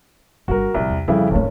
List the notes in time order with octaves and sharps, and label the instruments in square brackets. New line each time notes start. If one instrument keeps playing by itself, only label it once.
[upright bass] G1 G3 [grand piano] F#4 A#4
[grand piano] C2 [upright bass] A#2 F3
[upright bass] E2
[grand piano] F2 C#3 E4 [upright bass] G3
[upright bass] D#1 A3 [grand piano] G#1 C#4